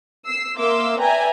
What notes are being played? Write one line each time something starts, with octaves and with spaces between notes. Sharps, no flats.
E6 C7
A#3 E5 F5 C6 D6 E6
B4 D5 E5 G5 G#5 A#5